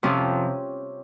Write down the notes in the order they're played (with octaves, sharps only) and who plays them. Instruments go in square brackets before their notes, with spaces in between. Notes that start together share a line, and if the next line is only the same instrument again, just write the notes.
[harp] F2 C3 F3 C#4